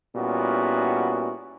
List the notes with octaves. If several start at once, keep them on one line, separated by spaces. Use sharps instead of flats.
A#2 G3 B3 C#4 E4 F#4